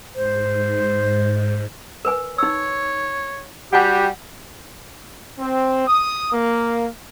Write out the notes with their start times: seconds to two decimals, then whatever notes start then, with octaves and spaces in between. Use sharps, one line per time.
0.15 G#2 C5
2.05 A#4 B4 G#5
2.38 D#4 C#5 E6
3.73 G3 F#4 G4 F#5 G#5
5.39 C4
5.88 D#6
6.32 A#3